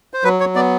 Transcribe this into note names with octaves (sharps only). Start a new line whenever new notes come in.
C5
F#3 B4
C#5
B3 D5